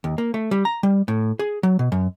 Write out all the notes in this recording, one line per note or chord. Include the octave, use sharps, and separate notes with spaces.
D#2
A#3
A3
G3
A#5
G3
A2
G#4
F#3
B2
F#2